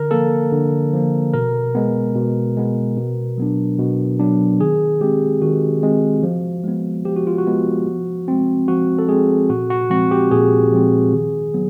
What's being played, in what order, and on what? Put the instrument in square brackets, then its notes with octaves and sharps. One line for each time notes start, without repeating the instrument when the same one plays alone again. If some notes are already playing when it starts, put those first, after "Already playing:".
Already playing: [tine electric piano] D3 A#4
F3 A#3 A4
D3
F3 A#3
B2 A#4
G#3 B3
B2
G#3 B3
B2
F#3 B3 D4
B2
F#3 B3 D4
D#3 G#4
G#3 C4 G4
D#3 F#4
G#3 C4
F3
G#3 B3
F3 G4
F#4
F4
F#4
G#3 B3
F3
G#3 C4
F3 F#4
A4
G#3 C4 G#4
A#2 F#4
F#4
F3 G#3 C4 F#4
G4
A#2 G#4
F3 G#3 C4
D#3
F#3 B3